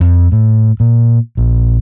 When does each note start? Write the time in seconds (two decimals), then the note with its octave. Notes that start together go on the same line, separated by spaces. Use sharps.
0.01 F2
0.32 A2
0.80 A#2
1.37 A#1